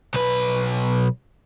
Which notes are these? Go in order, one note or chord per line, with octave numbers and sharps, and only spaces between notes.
B1 B4